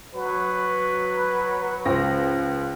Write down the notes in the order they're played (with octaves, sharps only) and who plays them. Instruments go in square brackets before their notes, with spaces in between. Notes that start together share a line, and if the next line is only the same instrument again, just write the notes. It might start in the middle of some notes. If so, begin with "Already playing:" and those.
[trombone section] F#3 [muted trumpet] B4
[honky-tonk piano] C#2 C5 A#6